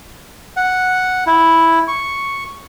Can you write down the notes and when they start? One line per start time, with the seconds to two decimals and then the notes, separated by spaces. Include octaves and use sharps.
0.57 F#5
1.27 E4
1.88 C#6